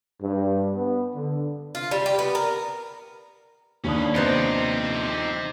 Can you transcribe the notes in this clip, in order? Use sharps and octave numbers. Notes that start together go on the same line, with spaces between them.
G2
B3
D3
F4
G3
G4
B3
A#4
D#2 C#4 D4 B4 D#6
C3 F3 B3 C4 D#4 G4 C5